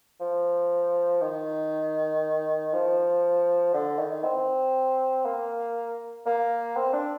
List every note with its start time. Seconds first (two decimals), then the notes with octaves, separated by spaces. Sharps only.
0.20 F3
1.21 D#3
2.73 F3
3.74 D3
3.99 D#3
4.24 C4
5.25 A#3
6.26 A#3
6.77 C4
6.93 D4